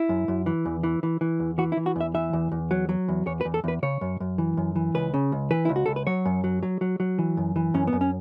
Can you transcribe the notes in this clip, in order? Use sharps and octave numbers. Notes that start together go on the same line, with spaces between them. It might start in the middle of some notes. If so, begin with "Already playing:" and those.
Already playing: E4
F#2
F#2
E3
E2
E3
E3
E3
E2
E3 F#4
E4
E3
F#4
E2 E5
E3 E5
E2
E2
F#3
F#3
E2
E2 C#5
B4
E2
A4
E2 B4
C#3 C#5
F#2
F#2
E3
F#2
E3
C#2 B4
C#3
C#2
E3 B4
C#2 E4
F#4
C#2 A4
B4
F#3 C#5
F#2
F#3
F#3
F#3
F#3
E3
F#2
E3
F#2 C#4
B3
F#2
C#4